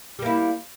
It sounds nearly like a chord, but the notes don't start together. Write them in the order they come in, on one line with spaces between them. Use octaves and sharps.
G3 A#3 E4